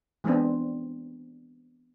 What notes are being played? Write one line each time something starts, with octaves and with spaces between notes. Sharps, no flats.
E3 G#3 B3 C4 D4